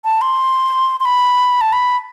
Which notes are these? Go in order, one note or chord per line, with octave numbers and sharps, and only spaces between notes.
A5
C6
C6
B5
A5
B5